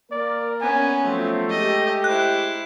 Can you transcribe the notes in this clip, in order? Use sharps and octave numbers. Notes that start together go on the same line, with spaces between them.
A#3 A#4 D5
B3 C#4 G#5
F3 F#3 A3 C4
G#3 G4 D#5
E4 C5 F#6